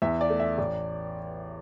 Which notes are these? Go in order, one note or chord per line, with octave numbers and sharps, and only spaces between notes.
E2 E5
D5
A3
E5
A1 D5